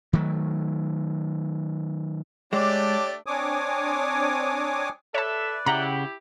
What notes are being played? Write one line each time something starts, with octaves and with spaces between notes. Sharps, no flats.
D#3 F#3 A3
G#3 A3 D4 G4 C#5 D5
C4 D4 C#5 G#5 D6 D#6
A4 B4 C#5 D5 E5 A5
C#3 E4 G4 F#5 G5 A#5